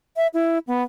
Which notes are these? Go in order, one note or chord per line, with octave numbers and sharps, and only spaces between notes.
E5
E4
B3